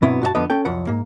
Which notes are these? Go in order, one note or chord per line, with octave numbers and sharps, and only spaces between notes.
G2 B2 F#3 B3 C4 E4
G2 F#4 D#5 A5
F2 D3 F3 B3 D#5
C#4 A4 G5
C2 F2 F3 F#3 F#5
G#2 A#3